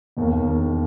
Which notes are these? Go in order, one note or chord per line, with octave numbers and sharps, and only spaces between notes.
E1 D#2 D#3 A#3